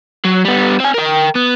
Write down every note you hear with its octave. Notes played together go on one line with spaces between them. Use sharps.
F#3
G3 B3
C4 G#5
A#4 G5
B3